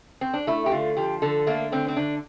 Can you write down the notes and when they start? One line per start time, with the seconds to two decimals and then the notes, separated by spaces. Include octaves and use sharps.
0.21 C4
0.34 D4
0.47 A3 E4
0.66 G4
0.72 D3 F4
0.97 F3 G4
1.22 D3 A4
1.47 A3 A#3
1.72 D3 C4
1.88 C4
1.97 D3 D4